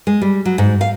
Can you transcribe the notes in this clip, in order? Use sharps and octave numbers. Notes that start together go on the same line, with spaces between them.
G#3
G3
F#3
G#2
F5